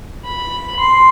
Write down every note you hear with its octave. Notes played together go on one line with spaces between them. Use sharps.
B5
C6